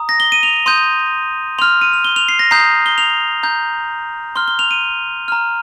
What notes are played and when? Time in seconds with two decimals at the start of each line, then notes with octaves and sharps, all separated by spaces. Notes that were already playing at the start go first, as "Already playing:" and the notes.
Already playing: A#5 D#6
0.09 A#6
0.20 G7
0.32 D#7
0.43 F7
0.66 C6 D#6 G6 D#7
1.59 C6 F6 F7
1.81 D#7
1.93 F7
2.04 G7
2.16 F7
2.28 C7
2.39 A#6
2.51 A#5 D#6 G6 C7
2.86 G7
2.98 F7
3.43 A#5 G6
4.36 C6 F6 G7
4.48 G7
4.59 F7
4.71 D#7
5.28 A#5 F6